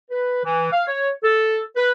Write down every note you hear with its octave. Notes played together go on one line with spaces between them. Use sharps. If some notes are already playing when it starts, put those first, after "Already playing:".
B4
E3
F5
C#5
A4
B4